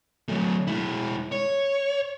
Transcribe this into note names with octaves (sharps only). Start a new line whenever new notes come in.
F#3 A3
G#3 E4
C#5